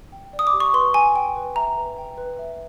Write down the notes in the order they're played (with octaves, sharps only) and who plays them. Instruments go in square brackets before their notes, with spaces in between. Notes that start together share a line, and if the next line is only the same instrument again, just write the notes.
[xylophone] G5
D5
D#6
D6
G4
C#6
B4 C6
G5 G#5
G5
B4
E5 A#5
B4
G5
B4
E5